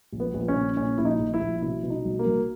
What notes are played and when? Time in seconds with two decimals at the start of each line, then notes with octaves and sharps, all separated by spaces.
0.12 A#1
0.20 B3
0.34 A#1
0.48 C#4
0.55 A#2
0.77 A#2 C#4
0.98 A#1 E4
1.05 D#4
1.19 A#1
1.34 E4
1.41 A#1
1.62 B2 E4
1.83 B2
1.90 D#4
2.05 B1
2.19 A#3
2.26 B1